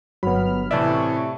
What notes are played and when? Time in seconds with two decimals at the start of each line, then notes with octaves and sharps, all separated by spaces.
0.23 G1 F#3 B3 B5 F6
0.71 A2 C3 E3 D5 E5 A5 C#6